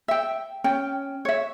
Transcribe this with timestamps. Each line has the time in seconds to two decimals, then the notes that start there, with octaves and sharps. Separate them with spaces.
0.08 E5 G5
0.64 C#4 G5
1.25 C#5 E5